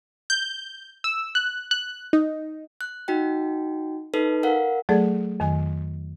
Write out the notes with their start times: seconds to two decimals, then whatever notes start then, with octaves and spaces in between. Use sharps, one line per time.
0.30 G6
1.04 E6
1.35 F#6
1.71 F#6
2.13 D#4
2.81 F#6
3.08 D#4 F#4 G5
4.14 D#4 A4 B4
4.43 A#4 F5 F#5
4.89 F#3 A3 G#4 A4 D5
5.40 F2 D#3 G#5